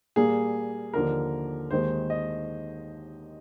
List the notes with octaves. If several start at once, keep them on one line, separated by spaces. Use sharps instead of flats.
A#2 G3 A#3 G#4
D#2 D3 F3 A#4
D#2 D#3 G#3 C5
D#5